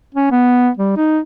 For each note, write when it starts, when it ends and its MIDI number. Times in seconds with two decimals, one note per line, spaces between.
0.15 0.30 61
0.31 0.69 59
0.77 0.93 55
0.97 1.19 63